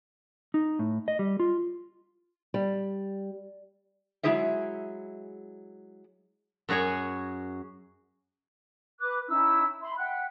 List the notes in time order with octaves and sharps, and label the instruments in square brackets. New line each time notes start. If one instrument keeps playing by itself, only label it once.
[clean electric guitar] D#4
A2
D#5
G3
F4
[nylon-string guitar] G3
[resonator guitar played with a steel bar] F#3 G#3 E4 G#4 C5 E5
[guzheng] F#2 F#4 G#4 C#5 G#5
[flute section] B4 D6 F#6
C#4 D#4 E4 E6
E5 B5 C6
E5 F#5 G5 F#6